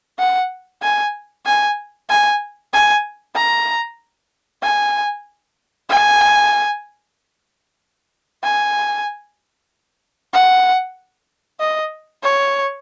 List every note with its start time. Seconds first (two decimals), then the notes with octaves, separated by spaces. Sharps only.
0.19 F#5
0.82 G#5
1.45 G#5
2.09 G#5
2.73 G#5
3.35 A#5
4.63 G#5
5.89 G#5
8.43 G#5
10.33 F#5
11.60 D#5
12.23 C#5